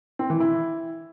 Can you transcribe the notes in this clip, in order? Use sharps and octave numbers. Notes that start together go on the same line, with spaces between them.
C4
E3
E4